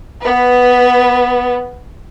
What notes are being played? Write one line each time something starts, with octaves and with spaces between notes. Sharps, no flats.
B3 B4